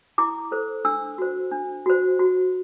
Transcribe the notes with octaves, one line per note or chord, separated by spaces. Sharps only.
E4 D6
A4 C5
D4 E6
F#4 C5
D4
F#4 C5
F#4